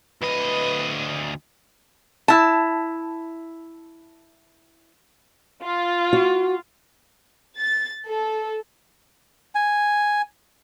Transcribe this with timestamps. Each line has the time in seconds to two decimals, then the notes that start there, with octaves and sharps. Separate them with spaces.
0.22 D2 B4 D#5
2.28 E4 A5
5.63 F4
6.13 F#4
7.58 A6
8.08 A4
9.55 G#5